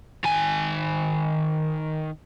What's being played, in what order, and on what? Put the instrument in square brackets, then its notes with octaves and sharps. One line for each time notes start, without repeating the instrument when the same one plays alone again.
[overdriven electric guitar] D#3 G#5